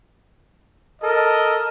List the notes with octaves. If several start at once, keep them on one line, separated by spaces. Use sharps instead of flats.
A4 A#4 D#5